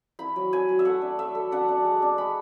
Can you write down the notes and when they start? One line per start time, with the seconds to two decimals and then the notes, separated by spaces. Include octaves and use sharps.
0.19 E4 B5
0.36 F#3
0.52 F#3 G#5
0.69 F#3
0.79 E5
0.85 A3 F#5
1.01 D4
1.18 A3 E5
1.35 A3
1.52 D4 F#5
1.68 D4
1.84 G#3
2.02 D4
2.18 G#3 B5